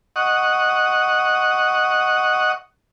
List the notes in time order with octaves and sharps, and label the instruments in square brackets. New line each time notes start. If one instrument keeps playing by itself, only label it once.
[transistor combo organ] D#5 F#5 C#6